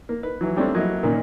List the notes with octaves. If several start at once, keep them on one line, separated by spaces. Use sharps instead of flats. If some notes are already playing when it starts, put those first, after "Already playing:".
A#3
B4
E3 F#3
G3 A3 C4 D4 C#5
F#3 A#3 E4 D#5
A#2 D#3 A#3 C#4 D#4